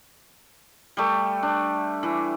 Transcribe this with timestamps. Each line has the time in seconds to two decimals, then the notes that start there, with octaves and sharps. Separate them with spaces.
0.97 G3 A3
1.43 D4
2.03 E3